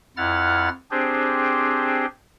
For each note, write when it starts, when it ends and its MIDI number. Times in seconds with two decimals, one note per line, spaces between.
0.17 0.69 41
0.17 0.69 64
0.17 0.69 78
0.17 0.69 89
0.17 0.69 93
0.91 2.06 60
0.91 2.06 62
0.91 2.06 67
0.91 2.06 68
0.91 2.06 72